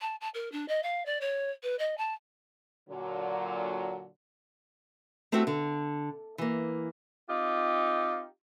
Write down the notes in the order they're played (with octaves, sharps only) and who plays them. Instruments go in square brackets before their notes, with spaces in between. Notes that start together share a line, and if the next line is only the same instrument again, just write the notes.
[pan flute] A5
A5
A#4
D4
D#5
F5
D5
C#5
B4
D#5
A5
[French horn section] A#2 D3 F#3
[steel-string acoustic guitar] A3 C4 E4 F#4 G4
D3
E3 A#3
[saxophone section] C4 D#4 F4 G4